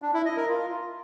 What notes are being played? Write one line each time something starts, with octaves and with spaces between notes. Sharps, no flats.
D4
E4
D#5
A#4
F4